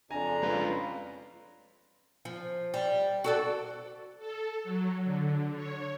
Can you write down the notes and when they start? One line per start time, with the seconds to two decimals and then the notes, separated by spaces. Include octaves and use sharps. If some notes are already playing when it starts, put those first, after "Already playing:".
0.11 F2 C#3 D4 G#5 A#5
0.43 C#4 F4 B4
2.25 F3
2.74 G3
3.24 F#4 A4 D5
4.19 A4
4.64 F#3
5.04 D3
5.56 C#5